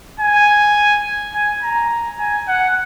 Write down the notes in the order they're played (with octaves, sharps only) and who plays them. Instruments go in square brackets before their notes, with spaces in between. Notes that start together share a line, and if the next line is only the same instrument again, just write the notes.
[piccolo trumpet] G#5
G#5
A#5
G#5
F#5